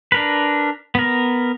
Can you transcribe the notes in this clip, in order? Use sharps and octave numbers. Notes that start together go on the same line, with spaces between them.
D4 A#4 B4
B3 A#4